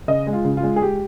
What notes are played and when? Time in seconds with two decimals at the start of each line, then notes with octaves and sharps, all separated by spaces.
0.08 C#3 D#5
0.27 G#3
0.33 F4
0.45 C#3
0.57 F4
0.63 G#3
0.76 G#4
0.82 G#3 G4